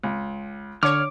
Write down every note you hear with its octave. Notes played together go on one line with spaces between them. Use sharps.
C#2
D3 C#5 D6 F6